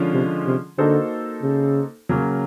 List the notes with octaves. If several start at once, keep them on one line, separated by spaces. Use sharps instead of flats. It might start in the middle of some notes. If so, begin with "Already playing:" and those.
Already playing: D3 F3 G#3 C#4 F4
C3
C3
D3 A#3 D#4 F#4 A4 C5
C#3
C#3 F#3 A#3 C#4